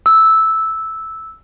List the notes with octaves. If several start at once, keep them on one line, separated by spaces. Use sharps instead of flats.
E6